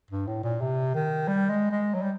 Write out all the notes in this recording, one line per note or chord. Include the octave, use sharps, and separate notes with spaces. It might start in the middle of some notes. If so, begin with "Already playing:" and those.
G2
A2
A#2
C3
D#3
G3
G#3
G#3
F#3
G3